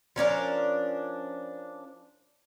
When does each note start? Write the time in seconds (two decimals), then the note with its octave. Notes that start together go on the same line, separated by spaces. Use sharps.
0.16 F3 C#4 D4 A#4